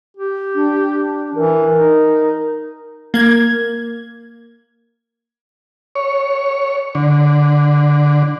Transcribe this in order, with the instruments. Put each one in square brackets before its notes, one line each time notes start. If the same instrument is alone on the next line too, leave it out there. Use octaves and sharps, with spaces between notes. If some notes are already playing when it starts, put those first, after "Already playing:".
[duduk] G4
[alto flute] D4
[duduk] E3 [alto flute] A#4
[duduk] D#4
[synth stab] A#3 G#6
[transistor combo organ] C#5
D3